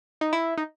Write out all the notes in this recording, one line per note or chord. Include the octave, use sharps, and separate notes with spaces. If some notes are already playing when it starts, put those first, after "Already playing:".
D#4
E4
D#4